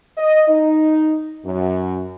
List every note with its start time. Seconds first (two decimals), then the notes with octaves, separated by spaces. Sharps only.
0.17 D#5
0.49 D#4
1.46 F#2